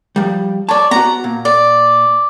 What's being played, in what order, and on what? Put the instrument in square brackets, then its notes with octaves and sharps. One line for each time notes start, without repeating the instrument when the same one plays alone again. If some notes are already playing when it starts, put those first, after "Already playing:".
[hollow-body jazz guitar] F3 G3
[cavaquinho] C#5 D5 [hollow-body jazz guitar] A5
[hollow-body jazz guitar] B3 F#4 [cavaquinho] A#5
[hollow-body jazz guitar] A#2
[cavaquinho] D5